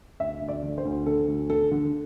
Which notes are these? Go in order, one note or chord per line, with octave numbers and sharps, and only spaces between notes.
D2 E5
D2
D5
D3
C5
D2
D3 A4
D2
D3 A4
D3